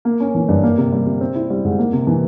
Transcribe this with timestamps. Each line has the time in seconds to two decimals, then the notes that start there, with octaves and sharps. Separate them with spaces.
0.05 A#3
0.20 C#4
0.35 E3
0.49 G2
0.63 A#3
0.78 C3
0.92 G3
1.06 C3
1.21 C4
1.35 E4
1.50 G3
1.64 G#2
1.79 A#3
1.93 C3
2.07 E3